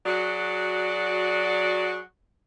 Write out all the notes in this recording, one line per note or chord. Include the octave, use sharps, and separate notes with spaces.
F#3 F#4 G#4 D5